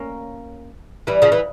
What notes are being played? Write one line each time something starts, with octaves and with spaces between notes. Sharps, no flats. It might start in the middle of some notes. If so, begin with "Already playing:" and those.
Already playing: A#3 C#4
E3 G3
C#3 F3
E3